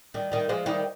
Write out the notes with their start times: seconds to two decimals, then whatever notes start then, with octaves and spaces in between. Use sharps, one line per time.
0.14 D#3 G3
0.32 D#3 G3
0.49 F3 G#3
0.66 D#3 G3